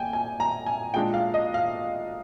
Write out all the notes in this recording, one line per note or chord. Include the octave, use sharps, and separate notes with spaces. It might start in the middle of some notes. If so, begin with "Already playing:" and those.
Already playing: A#3 G5 G#5
G#5
A#5
G#5
A#2 G#3 D4 G5
F5
D#5
F5